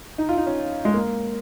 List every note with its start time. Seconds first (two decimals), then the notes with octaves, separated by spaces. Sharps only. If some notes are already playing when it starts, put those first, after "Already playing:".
0.18 D#4
0.29 F4
0.37 D#4
0.46 C#4
0.85 G#3
0.94 A#3